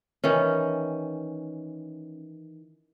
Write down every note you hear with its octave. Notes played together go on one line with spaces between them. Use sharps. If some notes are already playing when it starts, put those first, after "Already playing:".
D#3 E3 C#4